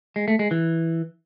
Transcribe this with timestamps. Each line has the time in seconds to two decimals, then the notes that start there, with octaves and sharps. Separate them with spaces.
0.16 G#3
0.28 A3
0.39 G#3
0.51 E3